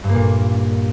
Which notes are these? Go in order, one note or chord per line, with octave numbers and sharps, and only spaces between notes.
G2
A#3
A#2